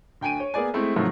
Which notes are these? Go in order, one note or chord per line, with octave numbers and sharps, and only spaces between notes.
D2 G5 G#5 D7 D#7
C#5
A#3 B3 G#4 D5 G#5
G#3 A3 C4 E4
G#2 C3 D#3 F3 F#3 A3